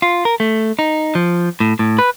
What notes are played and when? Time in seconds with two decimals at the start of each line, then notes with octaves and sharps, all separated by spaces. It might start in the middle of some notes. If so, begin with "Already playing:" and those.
0.02 F4
0.25 A#4
0.40 A3
0.79 D#4
1.15 F3
1.60 A2
1.79 A2
1.99 B4